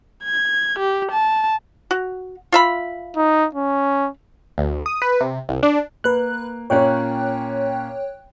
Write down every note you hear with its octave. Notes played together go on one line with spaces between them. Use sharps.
G#6
G4
A5
F#4
F4 E5 B5
D#4
C#4
D2
D#6
B4
C3
C2
D4
A#3 B4 F#6
A#2 A#3 C#4 C#5 G5 F#6